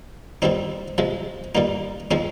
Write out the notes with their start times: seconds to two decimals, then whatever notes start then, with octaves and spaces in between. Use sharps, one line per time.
0.42 A#2 G3 C4 D#4
0.98 C3 F3 G#3
1.55 A#2 G3 A#3 D#4
2.11 F3 G#3 C4 D#4